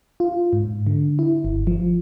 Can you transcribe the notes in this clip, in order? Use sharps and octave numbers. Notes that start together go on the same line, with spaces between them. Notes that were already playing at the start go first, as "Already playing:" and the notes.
F4
G#2
D3
E4
G1
F3